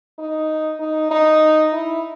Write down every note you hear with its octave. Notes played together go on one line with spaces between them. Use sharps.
D#4
D#4
D#4
E4